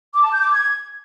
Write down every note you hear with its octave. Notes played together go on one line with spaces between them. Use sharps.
D6
A5
G6
D6
G#6